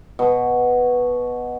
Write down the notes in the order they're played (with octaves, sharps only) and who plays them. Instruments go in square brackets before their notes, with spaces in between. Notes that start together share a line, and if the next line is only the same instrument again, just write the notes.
[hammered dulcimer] B2